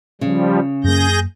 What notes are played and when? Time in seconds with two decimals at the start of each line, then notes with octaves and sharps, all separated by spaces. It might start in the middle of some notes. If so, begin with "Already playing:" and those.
0.21 C#3 F3 G3
0.84 F#2 A#3 G#4 G6 A#6